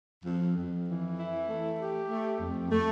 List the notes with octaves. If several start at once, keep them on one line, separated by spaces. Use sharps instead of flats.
F2
F2
E3
E4
A3
G4
A3
F2
A3